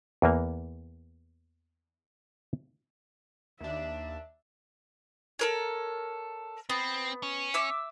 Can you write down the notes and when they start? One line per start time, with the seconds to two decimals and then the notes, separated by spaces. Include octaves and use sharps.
0.22 E2 E3 A#3
3.60 D#2 D4 E5
5.39 A4 A#4 C#5
6.70 B3 C4
7.23 C#4
7.54 E5 D6 E6